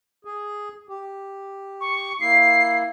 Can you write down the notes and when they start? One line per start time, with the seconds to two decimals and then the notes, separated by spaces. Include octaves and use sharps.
0.25 G#4
0.89 G4
1.81 C#6
2.21 A#3 E4 C7